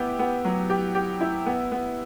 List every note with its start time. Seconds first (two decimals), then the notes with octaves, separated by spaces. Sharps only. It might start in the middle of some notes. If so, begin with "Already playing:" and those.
Already playing: B3 E4 G4
0.19 B3
0.45 F#3
0.70 G4
0.95 G4
1.21 E4
1.46 B3
1.72 B3